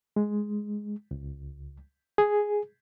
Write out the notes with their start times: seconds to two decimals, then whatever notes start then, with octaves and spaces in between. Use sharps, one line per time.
0.16 G#3
1.11 C#2
2.18 G#4